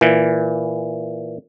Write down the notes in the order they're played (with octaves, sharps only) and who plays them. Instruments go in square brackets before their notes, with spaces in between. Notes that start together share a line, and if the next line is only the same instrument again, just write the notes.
[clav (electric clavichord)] A#2 E3